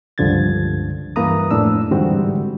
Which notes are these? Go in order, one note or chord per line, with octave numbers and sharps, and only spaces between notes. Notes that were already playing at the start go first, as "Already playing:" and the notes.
C#2 G2 D3 F3 G#6 A6
G2 E3 A#3 B4 A#5 D#6
F2 A2 D4 E6
G#2 D3 E3 G3 C4 F#4